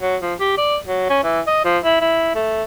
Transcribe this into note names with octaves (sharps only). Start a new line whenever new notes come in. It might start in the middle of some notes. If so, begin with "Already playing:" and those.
F#3
F3
G4
D5
F#3
C#4
E3
D#5
F3
E4
E4
A3